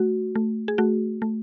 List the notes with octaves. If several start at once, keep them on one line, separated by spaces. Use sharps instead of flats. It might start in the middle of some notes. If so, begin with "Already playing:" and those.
Already playing: A3 F#4
A3
G#4
A3 F#4
A3